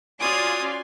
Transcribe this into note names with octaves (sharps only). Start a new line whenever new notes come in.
C#4 F4 F#4 D5 G#5 C6 D#6